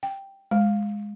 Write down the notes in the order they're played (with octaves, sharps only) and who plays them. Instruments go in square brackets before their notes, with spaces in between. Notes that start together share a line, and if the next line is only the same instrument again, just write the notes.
[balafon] G5
G#3